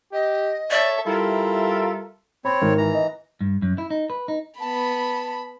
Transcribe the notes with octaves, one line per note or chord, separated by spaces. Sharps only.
G4 D#5
A4 C#5 D5 E5
G3 E4 F4 A4 A#4 E5
C4 C#5 B5
G#1 A#4
E3 A#5
D#5
G2
F#2
E4
D#4
B4
D#4
B3 A5 B5